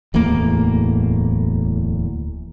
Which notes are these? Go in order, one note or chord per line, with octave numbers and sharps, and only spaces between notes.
D1 E2 A2 A#3